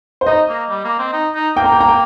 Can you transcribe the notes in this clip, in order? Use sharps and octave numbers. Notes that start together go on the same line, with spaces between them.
C5
D#4 D#5
A#3
G3
A#3
C4
D#4
D#4
A#3 G5
A#5
G5
A#5
G5